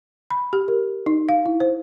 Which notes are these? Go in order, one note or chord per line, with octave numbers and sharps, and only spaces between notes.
B5
G4
A#4
D#4
F5
E4
C5